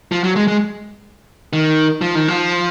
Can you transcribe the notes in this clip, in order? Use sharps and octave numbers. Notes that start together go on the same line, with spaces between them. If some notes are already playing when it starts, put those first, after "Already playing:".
F3
F#3
G#3
G#3
D#3
F3
D#3
F3